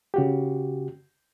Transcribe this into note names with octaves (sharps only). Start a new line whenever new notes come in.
C#3 F#4 G4